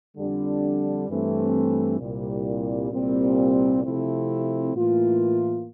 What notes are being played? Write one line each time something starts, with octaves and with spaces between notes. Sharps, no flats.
F2 D3 G3 D4
G2 E3 A3 C4
C2 A#2 G3
C2 A#2 G3 C4
C3 F3 A3 C4 E4
A2 E3 A#3 F4